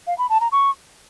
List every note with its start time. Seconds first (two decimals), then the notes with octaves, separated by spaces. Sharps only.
0.07 F5
0.18 B5
0.29 A5
0.41 A#5
0.52 C#6